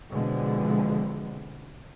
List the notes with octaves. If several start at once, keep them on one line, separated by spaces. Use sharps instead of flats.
B2 D3 E3 F3 G#3 C4